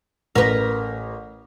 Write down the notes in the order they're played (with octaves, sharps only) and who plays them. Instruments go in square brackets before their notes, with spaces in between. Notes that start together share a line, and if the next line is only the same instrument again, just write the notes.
[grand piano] A1 [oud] A#4 B4